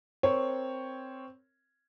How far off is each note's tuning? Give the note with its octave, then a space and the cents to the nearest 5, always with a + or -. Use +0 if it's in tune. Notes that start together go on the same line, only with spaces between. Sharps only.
C4 +0 A#4 +0 C#5 +0